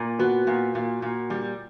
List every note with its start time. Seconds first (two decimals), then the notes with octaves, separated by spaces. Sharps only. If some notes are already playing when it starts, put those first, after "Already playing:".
Already playing: A#2
0.19 B3 F#4
0.47 A#2
0.75 A#2
1.02 A#2
1.30 G3